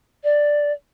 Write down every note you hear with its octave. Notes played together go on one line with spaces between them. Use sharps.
D5